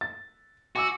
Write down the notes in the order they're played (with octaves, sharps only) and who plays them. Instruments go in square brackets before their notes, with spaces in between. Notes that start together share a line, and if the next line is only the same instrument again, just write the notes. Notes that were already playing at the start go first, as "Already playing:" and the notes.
[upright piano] A6
[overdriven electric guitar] F#4 [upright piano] G#5 D6 E6